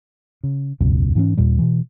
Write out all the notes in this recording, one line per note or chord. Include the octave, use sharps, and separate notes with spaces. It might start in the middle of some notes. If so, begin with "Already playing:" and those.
C#3
E1 C#2 F#2 B2
G#2 E3 C4 C#4
D#2 A#2 G3
B2 E3